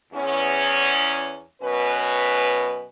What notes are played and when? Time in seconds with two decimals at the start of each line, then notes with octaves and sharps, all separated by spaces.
0.13 E2 C#4
1.62 F#2 B2 C#4 B4